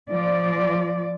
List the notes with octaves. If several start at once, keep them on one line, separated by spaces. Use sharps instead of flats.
F3 D5